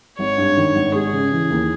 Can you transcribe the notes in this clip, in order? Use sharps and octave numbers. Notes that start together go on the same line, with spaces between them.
G#1 C#5
G2
D#3
G#1
G#3 G#4
C#3
E3
D#2